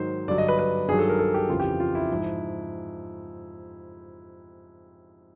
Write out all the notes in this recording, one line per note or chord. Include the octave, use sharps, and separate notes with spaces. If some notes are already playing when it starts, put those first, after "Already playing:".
Already playing: G#2 D#3 F#3 C5
G2 D3 F#3 D5
D#5
B4
B4
G2 D#3 F#3 G#4
A4
A#4
A4
G4
F2 C#3 E3 F4
G4
F4
E4
G#2 F3